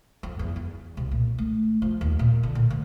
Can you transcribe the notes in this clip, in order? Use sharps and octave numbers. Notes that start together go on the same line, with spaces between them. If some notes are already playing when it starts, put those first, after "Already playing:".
F2
E2
E2
C2
A#2
A3
F3
D#2
A#2
D3
A#2
D2